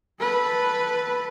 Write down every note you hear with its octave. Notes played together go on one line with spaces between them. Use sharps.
A4 B4